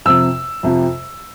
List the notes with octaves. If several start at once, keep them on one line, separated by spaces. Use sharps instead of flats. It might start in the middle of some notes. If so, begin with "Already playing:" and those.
F2 C3 F3 E6
F2 C3 F3